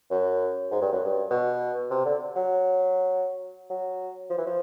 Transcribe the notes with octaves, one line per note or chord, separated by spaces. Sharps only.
F#2
G#2
G2
F#2
G2
B2
C3
D3
F#3
F#3
F3
E3
F3